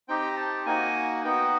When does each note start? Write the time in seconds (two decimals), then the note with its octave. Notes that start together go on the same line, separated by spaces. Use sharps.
0.08 C4 D#4 G4 G5
0.37 A5
0.66 A#3 D#4 F#4 G#5
1.24 B3 D#4 F#4 G5